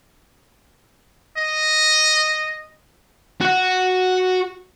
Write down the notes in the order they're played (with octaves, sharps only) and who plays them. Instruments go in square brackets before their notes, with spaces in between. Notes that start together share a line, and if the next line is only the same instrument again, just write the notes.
[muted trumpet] D#5
[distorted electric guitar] F#4 F#5